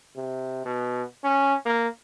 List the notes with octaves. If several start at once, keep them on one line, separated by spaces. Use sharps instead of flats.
C3
B2
C#4
A#3